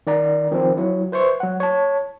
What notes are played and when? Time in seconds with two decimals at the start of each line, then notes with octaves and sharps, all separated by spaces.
0.07 D#3 D5 A#5
0.51 D#3 F3 C4
0.77 F#3 E4
1.12 B4 C5 E5 C#6
1.40 F#3 F#5
1.60 C#5 A5